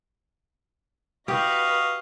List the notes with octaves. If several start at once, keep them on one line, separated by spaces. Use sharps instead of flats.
F#4 G4 B4 D#5 F5 C#6